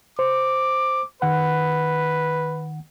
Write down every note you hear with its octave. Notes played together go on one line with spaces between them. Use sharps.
C5 D6
D#3 B4 F#5